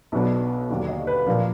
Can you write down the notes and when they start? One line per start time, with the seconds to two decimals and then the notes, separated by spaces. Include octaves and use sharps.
0.12 B1 B2 F#3 B3 D4
0.70 D#2 D3 F#3 D4
0.89 D#5
1.07 B4
1.27 A#2 F3 A#3 D4 F5